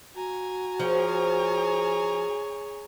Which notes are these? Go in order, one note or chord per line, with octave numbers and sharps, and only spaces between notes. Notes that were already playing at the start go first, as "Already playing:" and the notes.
F#4 G#5 A#5
F3 G#4 C#5